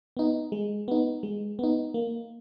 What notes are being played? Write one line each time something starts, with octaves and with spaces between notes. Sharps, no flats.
B3 D#4
G#3
B3 D#4
G#3
B3 D#4
A#3